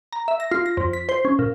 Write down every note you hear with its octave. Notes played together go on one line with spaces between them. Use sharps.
A#5
E5
A#6
F4
A#6
F2
B6
C5
C#4
A#2